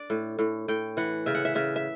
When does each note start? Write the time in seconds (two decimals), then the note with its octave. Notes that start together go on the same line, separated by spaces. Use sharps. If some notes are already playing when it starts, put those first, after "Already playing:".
Already playing: D4 D5
0.10 A2
0.39 A2
0.68 A2 G5
0.97 E3 F#5
1.26 C#3 E5
1.35 F#5
1.45 E5
1.55 C#3 E5
1.76 E5